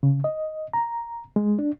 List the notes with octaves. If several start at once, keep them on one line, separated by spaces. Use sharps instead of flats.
C#3
D#5
A#5
G#3
D4